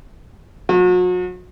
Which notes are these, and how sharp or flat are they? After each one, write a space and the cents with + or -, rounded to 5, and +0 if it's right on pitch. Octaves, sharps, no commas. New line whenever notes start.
F#3 -40 F#4 -35